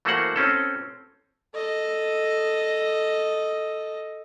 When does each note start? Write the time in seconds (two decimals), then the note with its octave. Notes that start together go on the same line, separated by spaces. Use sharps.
0.05 E3 A3 A#3 F#4 C5 F#5
0.36 C4 C#4 A4
1.54 A4 D#5